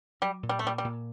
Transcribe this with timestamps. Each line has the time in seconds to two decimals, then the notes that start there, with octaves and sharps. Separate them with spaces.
0.22 F#3 G3
0.43 A#2
0.49 G3
0.59 A3
0.64 A#2 G3
0.78 G3
0.84 A#2